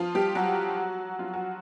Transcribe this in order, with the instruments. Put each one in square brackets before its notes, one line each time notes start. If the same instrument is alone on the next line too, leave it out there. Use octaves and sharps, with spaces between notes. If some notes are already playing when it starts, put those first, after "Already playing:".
Already playing: [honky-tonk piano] F3 F4
G3 G4
F#3 F#4
F4
F#4